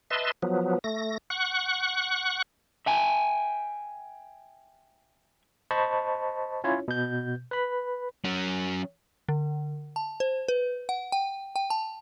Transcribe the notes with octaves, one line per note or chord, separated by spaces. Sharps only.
B4 D#5 E5 A5 C6
F3 F#3 B3
A3 A#6
F#5 C#6 F#6
E5 G5 G#5
C5 D#5 A5 B5 C#6
C#4 E4 F4 C#5
B2 G6
B4 B5
F#3 C#4
D3
A5
C5
B4
F#5
G5
G5
A5